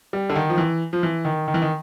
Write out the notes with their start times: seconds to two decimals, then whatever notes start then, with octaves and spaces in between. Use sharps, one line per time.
0.13 G3
0.30 D3
0.36 D#3
0.50 F3
0.58 E3
0.93 F3
1.03 E3
1.25 D#3
1.48 D#3
1.54 E3
1.62 D#3